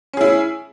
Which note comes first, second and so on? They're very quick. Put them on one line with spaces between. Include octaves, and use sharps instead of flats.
C#4 G#4 E4